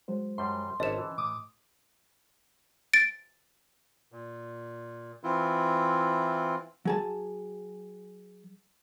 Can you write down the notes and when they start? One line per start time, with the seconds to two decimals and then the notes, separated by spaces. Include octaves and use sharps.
0.08 F#3 G#3 C5
0.38 F#2 G3 C6
0.80 G#1 C#4 B4 C#5 D#5 A5 E7
0.98 E3
1.18 A2 D6 D#6
2.94 A6 D7
4.12 A#2
5.23 E3 C4 E4 F4
6.85 F#3 G#4 A5